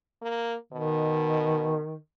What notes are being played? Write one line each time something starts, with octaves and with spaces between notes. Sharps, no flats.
A#3
B2 D#3